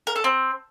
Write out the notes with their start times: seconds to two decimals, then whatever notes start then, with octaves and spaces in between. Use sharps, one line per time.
0.07 A#4
0.16 A4
0.24 C4